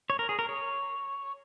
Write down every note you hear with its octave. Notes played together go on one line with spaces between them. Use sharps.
C#5
A#4
G#4
A#4
C#5